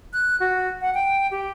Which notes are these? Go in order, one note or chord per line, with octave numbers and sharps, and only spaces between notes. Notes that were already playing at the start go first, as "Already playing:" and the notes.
F#6
F#4
F#5
G5
G4